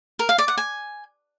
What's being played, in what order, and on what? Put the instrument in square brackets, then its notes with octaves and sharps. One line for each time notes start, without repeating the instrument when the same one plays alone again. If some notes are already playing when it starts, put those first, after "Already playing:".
[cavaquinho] A#4
F5
D5
F#5
G#5